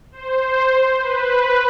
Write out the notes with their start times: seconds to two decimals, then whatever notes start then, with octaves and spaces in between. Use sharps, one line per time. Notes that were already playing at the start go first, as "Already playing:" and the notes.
0.12 C5
0.99 B4